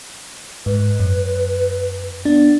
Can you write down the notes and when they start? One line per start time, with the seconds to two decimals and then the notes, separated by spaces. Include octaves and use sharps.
0.66 G#2 B4
1.00 F#2
2.25 B3 D4